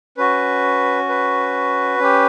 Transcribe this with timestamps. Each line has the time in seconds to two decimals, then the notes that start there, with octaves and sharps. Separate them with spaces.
0.17 C#4 F#4 B4
1.09 B4
1.99 C#4 G4